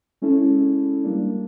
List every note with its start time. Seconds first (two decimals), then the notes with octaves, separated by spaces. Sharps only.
0.22 G#3 C#4 E4 A4
1.03 G3 A#3 D4